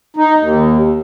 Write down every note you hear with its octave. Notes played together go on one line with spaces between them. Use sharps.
D#4
D#2